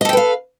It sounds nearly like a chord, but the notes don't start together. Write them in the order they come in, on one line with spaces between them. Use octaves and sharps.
D#5 A4 G5 B4 F5